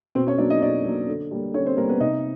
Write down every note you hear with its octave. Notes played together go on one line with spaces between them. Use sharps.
B2 C4 C5
C#4 C#5
F#3 A#3 D4 D5
D#4 D#5
B2 D4 D5
F#3 A#3
D3
G3 A#3
D3 C#4 C#5
C4 C5
G3 A#3 A#4
B3 B4
C3 D#4 D#5